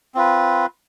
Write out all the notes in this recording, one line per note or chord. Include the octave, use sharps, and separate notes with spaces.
C4 F4 B4